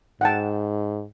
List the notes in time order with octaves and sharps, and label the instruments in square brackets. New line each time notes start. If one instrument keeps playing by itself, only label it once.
[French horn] G#2 [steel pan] F#5 G5 A5